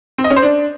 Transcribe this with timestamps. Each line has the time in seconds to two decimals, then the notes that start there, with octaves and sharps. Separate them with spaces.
0.18 C4
0.24 D#5
0.30 C#4
0.36 C5
0.42 D4